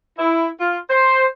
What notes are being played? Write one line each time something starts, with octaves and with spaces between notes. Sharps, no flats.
E4
F4
C5